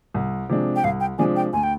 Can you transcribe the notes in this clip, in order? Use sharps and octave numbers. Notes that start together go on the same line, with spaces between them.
C2
C3 F3 G#3 D4
G5
C2 F5
G5
C3 F3 G#3 D4 G#5
G5
D2 G#5
G5